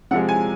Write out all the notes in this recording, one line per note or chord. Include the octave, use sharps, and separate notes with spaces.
C3 F3 G#3 F#5
G#5